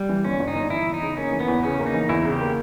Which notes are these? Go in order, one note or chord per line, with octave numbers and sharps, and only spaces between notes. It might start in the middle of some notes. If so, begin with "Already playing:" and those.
Already playing: G3
E3
G1 C#4
G2
D#4
G1
E3 E4
E2
D#4
C#3
A#3 C#4
E3
B3
E2
C#3 C#4
A#3
D#4
E3
E2 E4
C#3
G4
A#3